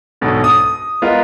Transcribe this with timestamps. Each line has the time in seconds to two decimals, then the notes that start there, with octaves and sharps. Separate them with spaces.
0.21 B1 G#2 B2 D3
0.44 D#6
1.02 G#3 B3 F4 A#4 D#5